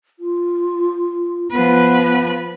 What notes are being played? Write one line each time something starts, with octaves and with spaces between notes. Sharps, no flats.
F4
F3 B3 B4